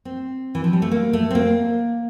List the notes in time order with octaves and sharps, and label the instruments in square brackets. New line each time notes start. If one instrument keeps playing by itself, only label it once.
[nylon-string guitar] C4
E3
F3
G3
A3
A#3
A3
C4
A#3